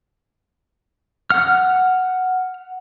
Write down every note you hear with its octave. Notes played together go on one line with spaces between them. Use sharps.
F#5 F6